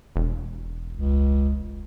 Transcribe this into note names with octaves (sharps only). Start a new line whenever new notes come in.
E1
C#2